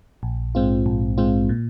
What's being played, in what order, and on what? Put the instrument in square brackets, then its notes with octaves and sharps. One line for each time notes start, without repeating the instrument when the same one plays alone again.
[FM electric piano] A#1
G#2 G#3 C4 F4
A#1
G#2 G#3 C4 F4
A#2